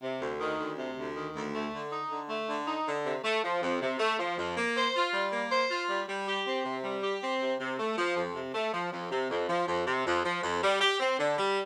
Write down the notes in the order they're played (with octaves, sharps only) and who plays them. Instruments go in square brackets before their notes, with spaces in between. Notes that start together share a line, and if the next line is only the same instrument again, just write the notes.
[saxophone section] C3
D2
D#3
D2
C3
D2
D#3
D2
A3
D3
D#4
D3
A3
D3
D#4
D3
C3
A3
F3
F2
C3
A3
F3
F2
A#3
C5
F4
G3
A#3
C5
F4
G3
G3
G4
C4
C3
G3
G4
C4
C3
C3
A3
F3
F2
C3
A3
F3
F2
C3
F2
F3
F2
C3
F2
F3
F2
G3
G4
C4
D3
G3